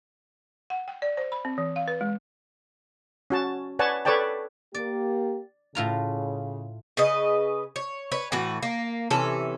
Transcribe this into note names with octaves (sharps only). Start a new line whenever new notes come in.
F#5
G5
D5
C5
B5
C4
E3
F5
B4
G#3
C#4 F#4 A5
B4 C#5 D5 F#5 G#5 A5
A4 B4 C#5 D5 G5 A5
A#3 G4 D5
A2 C#3 F4 A#5
C#3 B4 D#5
C#5
B4 C#5
A2 E3 F#4 B4
A#3
C3 E3 C#4 A4